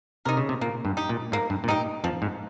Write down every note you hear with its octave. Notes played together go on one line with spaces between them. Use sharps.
C3 D#4 A#4
C#3
C3
A#2 A#3
G2
D#4 G4
A#2
G#2 A#3
G2
A#2
G#2 D#4 G4
F2 F3
G#2